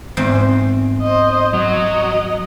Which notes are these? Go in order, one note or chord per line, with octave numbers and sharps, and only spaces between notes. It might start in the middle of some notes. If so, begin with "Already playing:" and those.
E2 G#2 C4
C5 D#5
F#3 D#5